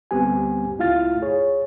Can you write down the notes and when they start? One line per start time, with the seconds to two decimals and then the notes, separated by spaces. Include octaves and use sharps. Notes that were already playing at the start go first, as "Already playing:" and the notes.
0.11 D2 G3 B3 C4 G4 G#5
0.78 C#2 A3 E4 F4 F5 A6
1.22 G#4 C#5